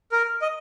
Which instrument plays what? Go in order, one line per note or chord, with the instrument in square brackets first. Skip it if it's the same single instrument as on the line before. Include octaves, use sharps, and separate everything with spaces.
[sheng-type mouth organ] A#4
D#5